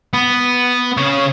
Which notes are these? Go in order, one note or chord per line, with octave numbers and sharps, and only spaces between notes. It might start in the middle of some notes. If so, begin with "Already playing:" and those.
B3
C#3 C#5